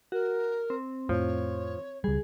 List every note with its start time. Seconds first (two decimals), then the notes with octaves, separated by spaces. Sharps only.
0.12 F#4 A#4
0.70 C4
1.09 F2 A2 F3 C#5
2.04 C#2 G3 G#4